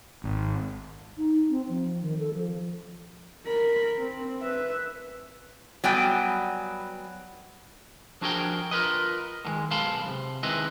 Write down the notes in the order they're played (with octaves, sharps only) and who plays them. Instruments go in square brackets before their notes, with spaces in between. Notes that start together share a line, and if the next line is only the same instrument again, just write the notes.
[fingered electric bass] G#1
[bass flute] D#4
C4
F3
D#3
A4
F3
[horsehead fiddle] A#4 B5
C4
B4 E5
[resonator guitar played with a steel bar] F#3 G3 B3 G5 G#5
[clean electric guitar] F3 D4 F#4 G#4 A#4 G5
F4 A#4 B4 D#5
A2 D#3 G#3
B1 G#3 F5 A5 B5 C6
C3
D#3 G#3 C4 E4 B4 D#5